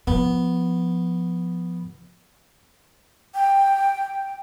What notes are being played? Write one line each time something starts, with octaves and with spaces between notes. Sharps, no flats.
F3 B3
G5